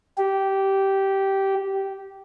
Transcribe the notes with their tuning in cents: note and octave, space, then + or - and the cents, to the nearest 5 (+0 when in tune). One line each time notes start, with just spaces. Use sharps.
G4 -15